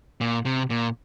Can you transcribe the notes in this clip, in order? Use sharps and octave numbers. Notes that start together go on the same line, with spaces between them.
A#2
C3
A#2